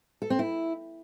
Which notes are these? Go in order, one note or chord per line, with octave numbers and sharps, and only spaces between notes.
A4
C4
E4